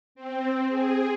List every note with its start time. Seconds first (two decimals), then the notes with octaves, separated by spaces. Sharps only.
0.15 C4
0.68 G#4